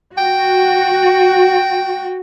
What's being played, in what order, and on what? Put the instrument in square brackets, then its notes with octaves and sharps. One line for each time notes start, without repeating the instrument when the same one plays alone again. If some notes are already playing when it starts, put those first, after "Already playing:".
[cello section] F#4 [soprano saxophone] G5